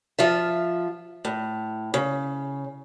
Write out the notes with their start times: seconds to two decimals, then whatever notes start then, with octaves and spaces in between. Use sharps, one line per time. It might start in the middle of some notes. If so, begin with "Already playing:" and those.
0.19 F3 F4 E5
1.25 A2
1.94 C#3